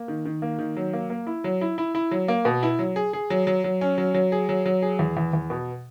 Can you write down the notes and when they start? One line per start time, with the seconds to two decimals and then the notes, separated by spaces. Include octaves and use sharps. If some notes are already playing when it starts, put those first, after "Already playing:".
Already playing: A#3
0.08 D#3
0.25 D#3
0.42 A#3
0.59 D#3
0.77 F#3
0.93 A#3
1.10 A#3
1.27 E4
1.44 F#3
1.61 E4
1.78 E4
1.95 E4
2.11 F#3
2.28 A#3
2.45 B2
2.63 E4
2.79 F#3
2.96 G#4
3.13 G#4
3.30 F#3
3.47 F#3
3.64 F#3
3.81 C#4
3.98 F#3
4.14 F#3
4.32 G#4
4.49 F#3
4.66 F#3
4.82 G#4
4.99 E2
5.17 E2
5.33 E2
5.50 B2